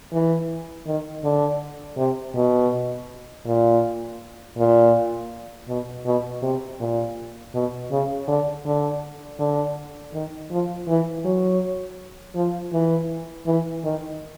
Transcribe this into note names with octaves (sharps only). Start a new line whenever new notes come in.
E3
D#3
D3
C3
B2
A#2
A#2
B2
B2
C3
A#2
B2
C#3
D3
D3
D3
D#3
F3
E3
F#3
F3
E3
E3
D#3